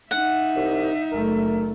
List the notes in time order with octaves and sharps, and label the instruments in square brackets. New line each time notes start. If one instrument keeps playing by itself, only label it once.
[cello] D#4 E5 [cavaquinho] F#5
[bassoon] C2
[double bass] F#1 A3 [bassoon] A#4